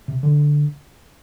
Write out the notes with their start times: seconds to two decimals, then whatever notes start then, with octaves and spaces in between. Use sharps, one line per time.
0.08 C3
0.23 D3